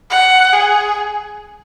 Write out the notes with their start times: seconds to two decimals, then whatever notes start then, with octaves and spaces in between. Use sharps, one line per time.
0.10 F#5
0.53 G#4